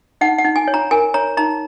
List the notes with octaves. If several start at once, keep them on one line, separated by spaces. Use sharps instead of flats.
D#4 F#5
F#5
D#4
G#5
C#5
A#5
A#4 G#5
C#5 A#5
D#4 A#5